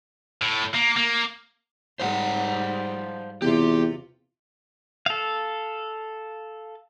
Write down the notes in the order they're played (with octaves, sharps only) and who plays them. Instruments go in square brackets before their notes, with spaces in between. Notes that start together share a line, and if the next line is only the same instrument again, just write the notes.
[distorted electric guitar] A2
A#3
A#3
[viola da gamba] G#2 G3 [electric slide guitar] C5 F5 F#5
[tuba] E2 [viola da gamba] C3 F4 [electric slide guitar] G4
[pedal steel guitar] A4 F5